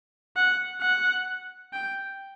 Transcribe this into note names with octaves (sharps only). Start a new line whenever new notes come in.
F#5
F#5
G5